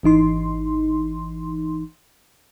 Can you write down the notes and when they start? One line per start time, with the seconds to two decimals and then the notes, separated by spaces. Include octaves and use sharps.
0.03 G#1 E3 D#4 C6